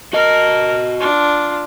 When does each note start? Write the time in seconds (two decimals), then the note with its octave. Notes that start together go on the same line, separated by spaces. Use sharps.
0.13 F#4 A#4 D#5
1.00 D4 F4